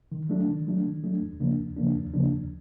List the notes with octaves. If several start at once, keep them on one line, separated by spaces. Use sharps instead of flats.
D#3
F#3 A3 D4
D#3
F#3 A3 D4
D#3
F#3 A3 D4
D#2
C#3 F3 A#3 D4
D#2
C#3 F3 A#3 D4
D#2
C#3 F3 A#3 D4
D#2